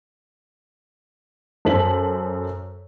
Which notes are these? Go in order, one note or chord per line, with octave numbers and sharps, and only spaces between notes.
F#2 A4 C5 A5 B6 F#7